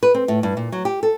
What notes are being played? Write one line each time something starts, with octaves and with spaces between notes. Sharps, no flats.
B4
C4
A2
G2
A#2
F#3
G4
A4